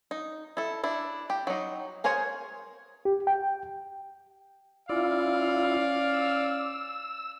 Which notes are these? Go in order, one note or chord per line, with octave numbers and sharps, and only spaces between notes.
D#4
E4 A4
D4 E4
G4
F#3 D#4
G#4 A#4 C5 C#5 G#5
G4
G5
C#4 E4 F4 D5 F5
E6